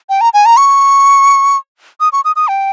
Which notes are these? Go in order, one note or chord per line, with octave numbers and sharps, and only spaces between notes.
G5
A#5
G#5
A#5
C#6
D#6
C#6
D#6
D#6
G5